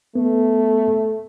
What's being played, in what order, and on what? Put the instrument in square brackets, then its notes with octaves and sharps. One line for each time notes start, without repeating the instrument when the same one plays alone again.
[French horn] A3 [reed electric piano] B3